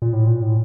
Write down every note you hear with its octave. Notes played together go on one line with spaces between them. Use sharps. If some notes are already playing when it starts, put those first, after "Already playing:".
A#2
A2
A#2
A2